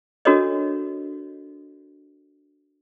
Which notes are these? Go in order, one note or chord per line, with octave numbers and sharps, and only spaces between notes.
D4 F#4 A4 A#4 C#5 D#5